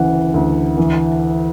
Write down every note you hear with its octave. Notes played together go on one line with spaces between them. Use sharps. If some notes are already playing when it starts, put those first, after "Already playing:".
Already playing: D2 C#3 E3 F#5
D2
E3